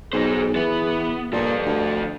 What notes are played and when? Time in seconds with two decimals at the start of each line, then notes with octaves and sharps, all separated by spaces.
0.13 B1 D#4 G#4 C5
0.55 E3 B3
1.33 G2 A#2 F3 A4
1.65 D2